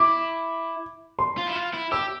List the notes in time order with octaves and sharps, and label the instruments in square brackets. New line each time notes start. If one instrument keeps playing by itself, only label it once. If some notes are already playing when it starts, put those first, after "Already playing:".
Already playing: [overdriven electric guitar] E4 [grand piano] D6
[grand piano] C6
[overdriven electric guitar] F4
E4
F4
E4
[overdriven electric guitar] G4 [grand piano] E6